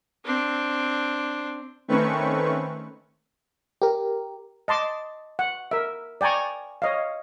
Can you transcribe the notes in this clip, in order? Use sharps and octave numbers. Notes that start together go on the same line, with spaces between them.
C4 D4
D#3 A3 C4 C#4 B4 C#6
G4 A#4
D#5 A5 C6 D6
F#5
A#4 E5
D5 G5 G#5 A#5 C#6
C#5 D#5 F5